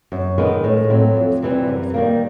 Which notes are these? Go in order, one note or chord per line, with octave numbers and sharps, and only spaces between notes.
F#2
D#3 G#3 B3
A2
F#3 A3 C4
F2
C3 E3 G3
F#2
D#3 G3 A#3